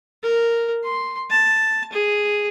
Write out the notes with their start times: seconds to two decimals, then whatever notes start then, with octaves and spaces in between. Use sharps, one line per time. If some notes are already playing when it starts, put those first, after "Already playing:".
0.23 A#4
0.84 C6
1.30 A5
1.92 G#4